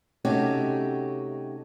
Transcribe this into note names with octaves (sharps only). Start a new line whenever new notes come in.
C3 A3 C#4 D#4 F#4 G4